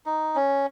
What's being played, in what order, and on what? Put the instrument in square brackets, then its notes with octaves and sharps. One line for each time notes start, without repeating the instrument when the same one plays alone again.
[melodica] D#4
C#4